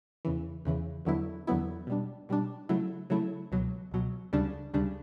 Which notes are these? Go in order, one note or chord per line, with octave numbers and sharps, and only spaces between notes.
E2 C#3 E3
E2 C#3 E3
E2 D3 F#3 B3 E4
E2 D3 F#3 B3 E4
B2 G3 D4
B2 G3 D4
C#3 F#3 A3 E4
C#3 F#3 A3 E4
C#2 B2 F#3
C#2 B2 F#3
D2 C#3 G3 D4
D2 C#3 G3 D4